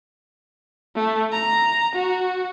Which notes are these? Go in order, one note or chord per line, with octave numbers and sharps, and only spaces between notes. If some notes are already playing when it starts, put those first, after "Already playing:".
A3
A#5
F#4